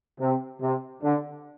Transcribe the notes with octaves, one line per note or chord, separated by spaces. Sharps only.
C3
C3
D3